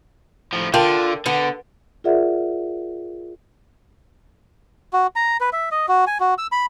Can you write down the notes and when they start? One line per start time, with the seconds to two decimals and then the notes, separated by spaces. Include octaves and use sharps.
0.53 A2 F3
0.74 D3 F4 A#4 G5 A5
1.26 D3 B3
2.04 F4 G#4 A#4 D5 E5 F#5
4.93 F#4
5.16 A#5
5.41 B4
5.53 E5
5.72 D#5
5.89 F#4
6.07 G#5
6.20 F#4
6.38 E6
6.52 B5